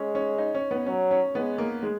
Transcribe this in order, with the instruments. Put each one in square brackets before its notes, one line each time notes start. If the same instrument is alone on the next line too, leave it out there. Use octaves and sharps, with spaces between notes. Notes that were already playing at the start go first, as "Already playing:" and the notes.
Already playing: [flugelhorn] G#3 [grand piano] C#4
[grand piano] C#4
D#4
C#4
B3
[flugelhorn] F#3 [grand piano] C#4
[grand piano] C#4
[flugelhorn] G#3 [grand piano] B3
[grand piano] A#3
G#3